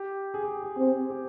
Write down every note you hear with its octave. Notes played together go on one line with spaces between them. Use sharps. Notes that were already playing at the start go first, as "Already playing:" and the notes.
Already playing: G4
G#4
G4
G4
C4 G4
G4